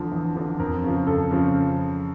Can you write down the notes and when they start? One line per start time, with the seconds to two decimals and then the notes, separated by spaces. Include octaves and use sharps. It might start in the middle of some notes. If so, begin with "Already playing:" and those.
Already playing: E2 D3 F3
0.11 E2
0.36 D3 F3
0.59 F2 A#4
0.83 C#3 F3
1.07 F2 A4
1.31 C#3 F3